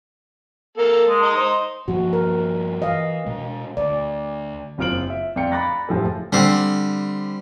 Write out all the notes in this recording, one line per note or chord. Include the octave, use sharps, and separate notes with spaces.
A#3 A4 A#4
G#3
D#5 A#5 D#6
C5
G2 F3 A#3 F#4
A#4
E3 D#5 F5
B2 G#3
D2 D5
F#1 C4 F4 F6 D7 F#7
E5
F2 D5 F5 G5 C#7
A#5 B5 D6 F#6 A6 A#6
F#1 A2 F3 G4 A4 G#5
D3 G3 C4